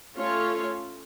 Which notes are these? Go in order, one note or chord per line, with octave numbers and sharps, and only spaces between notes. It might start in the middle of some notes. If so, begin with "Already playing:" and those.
A3 C#4 F4 A4 C#5